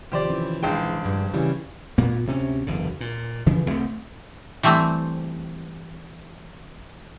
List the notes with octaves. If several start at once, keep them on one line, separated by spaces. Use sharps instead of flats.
C3 D#3 F3 G4 C5 D5
E3 C#4
A#1 G#2 G#4 G5
G2
C#3 E3 G3
A#2 A#3 B3
D2 C3 C#4
F#1 E2 D3
A#2
F1 C#3 E3 F3
C2 C3 A3 C4
E3 G3 A3 C4